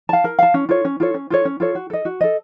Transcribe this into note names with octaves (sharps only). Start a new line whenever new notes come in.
F5 A5
A#4
F5 A5
C#4
F4 A4 C#5
C#4
F4 A4 C#5
C#4
F4 A4 C#5
C#4
F4 A4 C#5
F#4
A4 D#5
F#4
A4 D#5